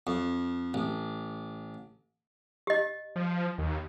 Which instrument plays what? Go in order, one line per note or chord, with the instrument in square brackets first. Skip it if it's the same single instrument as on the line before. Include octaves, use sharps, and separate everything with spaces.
[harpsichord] F2
A1
[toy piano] G4 D#5
[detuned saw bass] F3
D#2